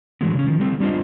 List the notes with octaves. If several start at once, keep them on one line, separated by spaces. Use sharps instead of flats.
A2 D3 E3 F#3 G#3 B3
C#3 C#4
D#3 F3
G3 A3 C4
G3 D4 F4 C5 D#5